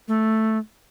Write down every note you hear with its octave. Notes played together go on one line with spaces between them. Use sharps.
A3